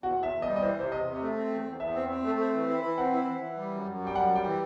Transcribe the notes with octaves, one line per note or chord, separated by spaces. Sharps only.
E2 F#4
E2
E5
E2
G3 D#5
D#5
E3 C5
C3 C5
E2 D#5
C3
A3
C4
E2
E2
E2 E5
C4
C4
A3
C4
E3
E4
E3
C4 F#5
E4
E3
E3
G3
F#2
F#2
G3
G5
F#2 F#5
G3 G5
E3